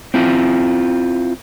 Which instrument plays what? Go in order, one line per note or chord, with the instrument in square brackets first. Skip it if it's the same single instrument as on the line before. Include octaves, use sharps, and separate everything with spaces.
[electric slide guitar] C4 E4 F4